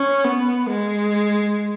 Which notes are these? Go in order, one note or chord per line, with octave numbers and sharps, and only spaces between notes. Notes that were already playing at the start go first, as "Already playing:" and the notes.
Already playing: C#4
B3
G#3